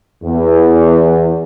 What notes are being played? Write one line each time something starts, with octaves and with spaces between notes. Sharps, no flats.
E2